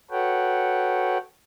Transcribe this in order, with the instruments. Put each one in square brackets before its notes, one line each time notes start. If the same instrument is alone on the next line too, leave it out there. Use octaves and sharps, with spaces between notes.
[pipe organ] F#4 A4 B4 C#5 F#5 G5